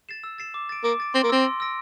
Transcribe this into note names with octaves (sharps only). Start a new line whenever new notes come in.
A6 C7 E7
E6
A6 C7 E7
D6
A6 D7
A#3 D6
A6 D7
C4 C6
A#3
C4 E6 A#6 D7
C6
E6 A#6 D7